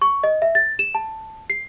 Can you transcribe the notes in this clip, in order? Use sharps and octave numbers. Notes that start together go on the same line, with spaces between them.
C#6
D#5
E5
A6
E7
A5
C7